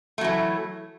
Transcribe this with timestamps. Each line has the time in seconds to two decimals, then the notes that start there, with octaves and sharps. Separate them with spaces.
0.18 A3
0.21 F#3
0.24 E3